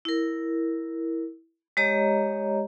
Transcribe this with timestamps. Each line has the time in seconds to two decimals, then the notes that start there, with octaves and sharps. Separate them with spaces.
0.05 E4 A#4
1.77 G#3 G4 C#5 D#5 A#5